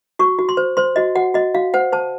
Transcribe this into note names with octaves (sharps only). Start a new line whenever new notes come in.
F#4 C#6
F#4
C6
C5
C5 C6
F#4 D#5
F#4 F#5
F#4 D#5
F#4 F5
C5 F#5
C5 A5